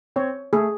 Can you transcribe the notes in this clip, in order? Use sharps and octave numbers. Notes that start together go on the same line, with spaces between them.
C4 C#5
A3 G#4